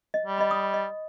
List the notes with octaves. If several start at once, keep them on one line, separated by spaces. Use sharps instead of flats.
D#5
G3
D#5 B5
D#6
D#5